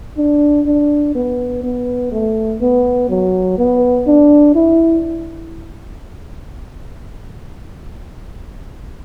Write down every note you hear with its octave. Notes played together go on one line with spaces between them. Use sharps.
D4
D4
B3
B3
A3
B3
F#3
B3
D4
E4